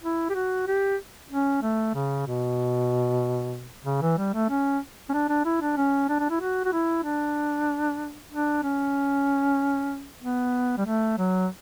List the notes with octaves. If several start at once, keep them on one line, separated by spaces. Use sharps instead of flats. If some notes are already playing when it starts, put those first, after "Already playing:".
E4
G4
F#4
G4
C#4
A3
C#3
B2
C#3
E3
G3
A3
C#4
C#4
D4
D4
E4
D4
C#4
D4
D4
E4
F#4
F#4
E4
D4
D4
C#4
B3
G3
A3
F#3